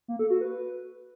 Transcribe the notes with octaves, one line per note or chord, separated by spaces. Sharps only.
A#3
A4
F#4
B4